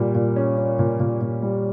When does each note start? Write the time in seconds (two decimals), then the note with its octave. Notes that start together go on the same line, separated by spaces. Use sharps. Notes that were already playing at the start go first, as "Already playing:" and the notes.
Already playing: A#2 G3
0.15 A#2
0.36 C#4
0.57 C#4
0.79 A#2
1.00 A#2
1.21 A#2
1.42 G3